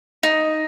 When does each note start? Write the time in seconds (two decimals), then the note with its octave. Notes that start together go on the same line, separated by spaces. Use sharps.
0.23 D#4